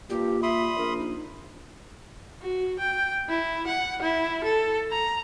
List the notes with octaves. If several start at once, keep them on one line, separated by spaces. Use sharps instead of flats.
G2 A#2 G4
E5 B5 C6 D#6
A#1 A#4
D#4
F#4
G5
E4
F#5
E4
A4
A#5